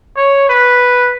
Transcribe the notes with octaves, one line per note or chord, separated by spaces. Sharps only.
C#5
B4